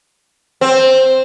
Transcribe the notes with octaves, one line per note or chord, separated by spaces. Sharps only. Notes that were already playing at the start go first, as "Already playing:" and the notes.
C4